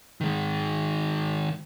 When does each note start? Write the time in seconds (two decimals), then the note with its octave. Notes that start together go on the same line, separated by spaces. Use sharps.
0.21 D#3 G#3